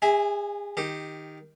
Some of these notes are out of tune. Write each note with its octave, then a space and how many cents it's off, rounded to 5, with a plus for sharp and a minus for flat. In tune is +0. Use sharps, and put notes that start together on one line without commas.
G#4 -35 E5 -25 G#5 +0
D#3 +0 G4 +5